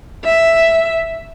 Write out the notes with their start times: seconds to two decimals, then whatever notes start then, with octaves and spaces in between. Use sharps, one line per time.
0.24 E5